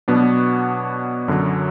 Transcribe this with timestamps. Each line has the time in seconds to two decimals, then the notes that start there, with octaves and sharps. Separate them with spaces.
0.08 B2 F#3 B3 D4 F#4
1.28 F#2 D3 F#3